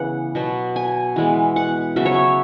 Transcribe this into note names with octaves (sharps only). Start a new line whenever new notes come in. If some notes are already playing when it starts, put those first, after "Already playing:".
Already playing: C#3 E3 B3 F#5
B2 F#3 B3
G#5
E3 G#3 B3
F#5
C#3 F#3 B3 E5
C#5
E5